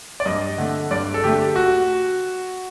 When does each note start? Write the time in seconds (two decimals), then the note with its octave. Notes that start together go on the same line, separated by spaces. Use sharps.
0.20 D5
0.26 G2 D#5
0.58 D3 A3 F#5
0.91 G2 D5
1.14 A4
1.24 D3 A3 G4
1.56 F#4